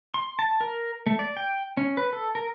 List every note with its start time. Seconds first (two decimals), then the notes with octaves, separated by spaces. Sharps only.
0.14 C6
0.39 A5
0.61 A#4
1.06 A3
1.19 D5
1.37 G5
1.77 C#4
1.97 B4
2.13 A4
2.35 A#4